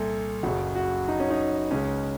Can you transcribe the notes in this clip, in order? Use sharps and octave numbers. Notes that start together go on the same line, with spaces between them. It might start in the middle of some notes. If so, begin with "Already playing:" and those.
Already playing: C2 A#2 A4
F#1 F#2 C#3 F#4
F#4
D#4
C#4
D#4
C#2 C#3 C#4